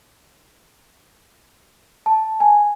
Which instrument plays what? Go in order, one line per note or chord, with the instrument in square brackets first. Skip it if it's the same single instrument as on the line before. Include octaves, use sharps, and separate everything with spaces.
[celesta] A5
G#5